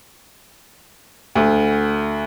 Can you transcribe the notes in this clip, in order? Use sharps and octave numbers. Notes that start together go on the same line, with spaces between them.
D2